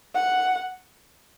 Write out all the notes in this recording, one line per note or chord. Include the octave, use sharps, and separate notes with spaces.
F#5